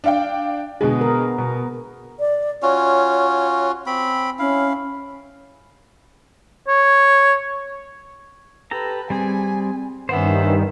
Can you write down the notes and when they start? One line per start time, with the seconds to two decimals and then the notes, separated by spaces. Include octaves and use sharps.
0.04 D4 F5 G5
0.81 B2 D3 G#3 B3 G#4
1.01 A#4
1.38 B2
2.20 D5
2.63 C#4 F4 F#4 C#5
3.86 C4 B5
4.39 C#4 E4 F5
6.68 C#5
8.71 G4 A4 B4 A#5
9.10 G3 C4 G#4 G#5
10.09 G2 D#3 B3 C#4 C5 E5